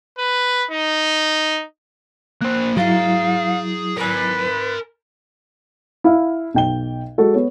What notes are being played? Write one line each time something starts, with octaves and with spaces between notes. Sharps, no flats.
B4
D#4
A#3 C5 F#6
F#3 E4 G#4 F5 A#5
A#4 B4 G#5
E4 F5
B1 G5 G7
G#3 F#4 A4
B3 C#5